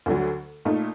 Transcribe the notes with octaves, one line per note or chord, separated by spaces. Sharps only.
D2 D3 F#3
A#2 A3 D#4